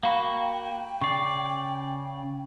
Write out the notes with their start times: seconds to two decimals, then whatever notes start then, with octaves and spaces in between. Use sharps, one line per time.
0.03 A#3 F#4 F5 G5 B5
1.01 C#3 D5 C#6 C7